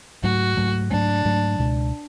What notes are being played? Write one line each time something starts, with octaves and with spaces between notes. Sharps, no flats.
G#2 F#3 A3 F#4
G#2 F#3 A3
G#2 F#3 A3 D4
G#2 F#3 A3
C#2 B2 G#3